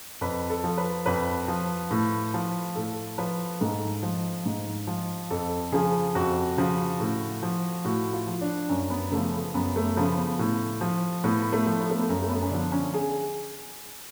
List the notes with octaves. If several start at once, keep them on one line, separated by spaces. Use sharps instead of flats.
F2 B4
A4
F3
B4
F2 B4
F3
A2
F3
A2 A4
F3 B4
G#2 A4
F3
G#2
F3
F2 A4
C#3 F3 G#4
F2 F#4
C#3 F3
A2
F3
A2 F#4
F4
F3
D4
F#2 C#4
B3
C#3 F3 A3
B3
F#2 B3
A3
C#3 F3 B3
B3
A2
F3
A2 B3
A3
F3
B3
A3
B3
F#2
A3
B3
C#4
D3 F3 D4
C#4
G#4